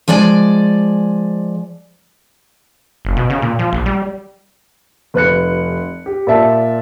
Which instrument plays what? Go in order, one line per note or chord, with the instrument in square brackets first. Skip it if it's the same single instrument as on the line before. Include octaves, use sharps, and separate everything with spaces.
[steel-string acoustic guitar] F3 G#3 D5 G#5
[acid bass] F#1
B2
C#3
A#2
F3
A#1
G3
[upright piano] F1 B4 F#6 C#7
G4
A#2 D5 E5 A5